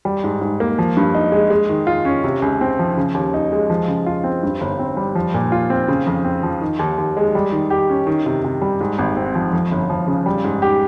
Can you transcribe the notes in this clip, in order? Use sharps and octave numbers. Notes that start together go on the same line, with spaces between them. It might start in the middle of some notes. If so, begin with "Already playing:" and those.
G3
G#2
G#2
A#3
F3
G2
D#4
G#3
G#3
D#3
F4
C#4
C3
C#2
C4
F3
C#3
D#2
D#4
G#3
F3
C#3
F4
C4
G2
G1
C4
G3
F3
A#2
F4
C4
C#3
F2
C4
F3
D#3
D#2
D#2
G#3
G3
D#3
G4
C#4
D#3
C3
C3
G3
G#2
G#1
C4
F3
F2
G1
F3
C#3
G3
G#2
G4